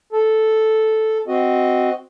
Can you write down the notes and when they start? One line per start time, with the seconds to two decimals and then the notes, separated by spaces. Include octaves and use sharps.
0.13 A4
1.28 C4 F#4 D#5